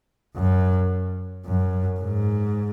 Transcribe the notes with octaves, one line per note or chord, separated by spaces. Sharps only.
F#2
F#2
G#2